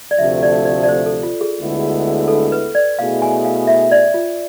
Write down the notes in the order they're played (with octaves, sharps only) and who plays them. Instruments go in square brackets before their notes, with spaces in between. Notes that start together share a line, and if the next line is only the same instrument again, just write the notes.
[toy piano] D5
[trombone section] D2 C3 F3 A3 [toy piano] E5
[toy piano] D5
D5
D5
C5
A4
F4
G#4
[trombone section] D2 D3 G#3 B3 E4
[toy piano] A4
B4
D5
[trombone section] B2 A3 E4 G#4 [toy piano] F5
[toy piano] G#5
F5
E5
D5
F4